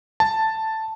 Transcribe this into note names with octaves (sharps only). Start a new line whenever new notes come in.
A5